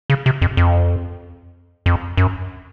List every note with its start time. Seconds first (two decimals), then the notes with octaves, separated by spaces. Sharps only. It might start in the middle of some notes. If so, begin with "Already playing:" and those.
0.10 C#3
0.26 C3
0.42 F2
0.57 F2
1.86 F2
2.17 F#2